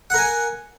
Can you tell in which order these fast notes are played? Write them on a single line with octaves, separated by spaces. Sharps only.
F#5 A#4 G#5